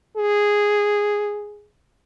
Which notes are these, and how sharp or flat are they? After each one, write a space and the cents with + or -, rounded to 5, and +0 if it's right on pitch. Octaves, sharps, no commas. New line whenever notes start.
G#4 -5